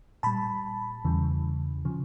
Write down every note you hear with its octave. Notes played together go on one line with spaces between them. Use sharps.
A#2 G3 A5 B5
E2 C#3 E3 G3
C#3 F3